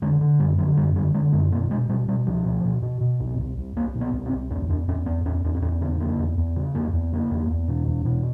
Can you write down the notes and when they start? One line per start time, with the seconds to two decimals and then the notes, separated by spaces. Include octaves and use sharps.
0.02 D3 G#3
0.21 D3
0.40 F#2 G3
0.58 D3 F#3
0.77 F#2 G3
0.95 D3 G3
1.14 D3 G#3
1.33 F#2 G#3
1.52 B2 A#3
1.70 B2 G#3
1.89 B2 G3
2.08 B2 G3
2.27 C#2 F3
2.45 B2
2.64 B2
2.82 B2
3.01 B2
3.20 C2
3.38 C2
3.57 C2
3.76 C2 A#3
3.95 B2
4.01 B3
4.13 C2
4.25 C4
4.33 C2
4.50 E2 C#4
4.69 E2 D4
4.88 E2 C#4
5.06 E2 B3
5.25 E2 C#4
5.44 E2 D4
5.54 C4
5.62 E2 C#4
5.81 C#3 B3
6.00 C#3 A#3
6.19 E2
6.38 E2
6.56 C#3
6.74 E2 A#3
6.93 E2
7.12 C#3 A#3
7.31 E2
7.50 E2
7.68 B2
7.87 E2
8.05 B2